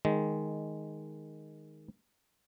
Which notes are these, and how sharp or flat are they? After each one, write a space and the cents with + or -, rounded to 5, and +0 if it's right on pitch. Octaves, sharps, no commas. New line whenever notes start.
D#3 +0 G#3 +5